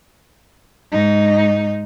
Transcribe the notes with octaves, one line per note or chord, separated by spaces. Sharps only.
G#2 D#4